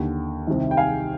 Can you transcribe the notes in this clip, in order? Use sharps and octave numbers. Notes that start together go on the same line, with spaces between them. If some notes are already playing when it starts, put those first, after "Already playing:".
Already playing: D#2 D3
C2 C3 D#3
G5
F5 G#5